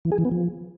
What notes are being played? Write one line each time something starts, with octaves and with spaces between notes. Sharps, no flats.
E3
G#4
E3
B3
F3